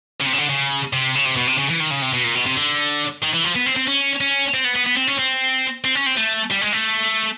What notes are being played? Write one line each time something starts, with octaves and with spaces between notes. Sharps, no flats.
C#3
C3
C#3
D3
C#3
C3
C#3
C3
B2
C3
C#3
E3
D#3
C#3
C3
B2
A#2
B2
C3
D3
D#3
E3
F3
B3
C4
C4
C#4
C#4
C4
B3
B3
B3
C4
C#4
C4
C4
C#4
C4
A3
G3
G#3
A3